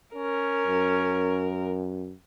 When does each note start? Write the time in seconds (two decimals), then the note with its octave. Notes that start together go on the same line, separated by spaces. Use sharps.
0.15 C#4 A#4
0.66 F#2